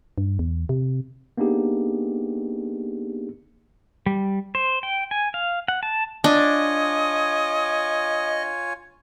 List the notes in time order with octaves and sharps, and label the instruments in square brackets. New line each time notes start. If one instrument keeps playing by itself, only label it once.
[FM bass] G2
E2
C3
[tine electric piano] A#3 B3 D4 D#4 G4 G#4
[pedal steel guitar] G3
C5
G5
G#5
F5
F#5
A5
[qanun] D4 [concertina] F4 C#5 G#5 [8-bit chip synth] D#5 [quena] D#6